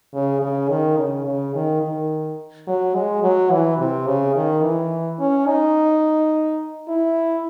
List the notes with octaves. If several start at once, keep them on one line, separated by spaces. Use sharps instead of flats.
C#3
C#3
D#3
C#3
C#3
D#3
D#3
F#3
G#3
F#3
E3
C3
C#3
D#3
E3
C#4
D#4
E4